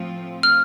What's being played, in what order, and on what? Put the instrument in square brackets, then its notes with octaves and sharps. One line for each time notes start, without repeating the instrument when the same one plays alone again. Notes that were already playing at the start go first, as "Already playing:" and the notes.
Already playing: [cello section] A2 F3 A3 C4 F4
[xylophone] F6